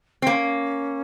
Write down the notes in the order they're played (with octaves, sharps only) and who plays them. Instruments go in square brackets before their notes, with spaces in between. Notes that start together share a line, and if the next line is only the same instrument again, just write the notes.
[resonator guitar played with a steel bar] C4
[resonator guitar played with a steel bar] A#3 [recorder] C#4